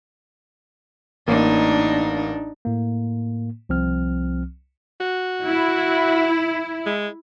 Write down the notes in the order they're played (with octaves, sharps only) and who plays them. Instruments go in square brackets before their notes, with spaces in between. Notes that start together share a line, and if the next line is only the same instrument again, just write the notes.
[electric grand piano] A1 A#3 [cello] D4 D#4
[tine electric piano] A2 A#3
C2 F3 C4 F6
[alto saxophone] F#4
[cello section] E4
[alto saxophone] G#3